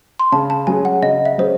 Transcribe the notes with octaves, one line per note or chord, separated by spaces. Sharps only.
C6
C#3 A5
A5
F#3 C#4 G#4 G#5
F#5
C#3 D#5
E5
F#3 C#4 G#4 C5